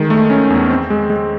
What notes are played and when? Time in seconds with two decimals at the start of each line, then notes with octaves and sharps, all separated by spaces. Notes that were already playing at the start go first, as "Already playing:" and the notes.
Already playing: D#3 G#3
0.10 A3
0.30 C#4
0.50 E2
0.70 C4
0.90 G#3
1.10 G#3